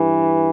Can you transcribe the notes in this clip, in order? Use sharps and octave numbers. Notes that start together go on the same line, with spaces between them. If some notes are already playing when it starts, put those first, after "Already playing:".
Already playing: G2 E3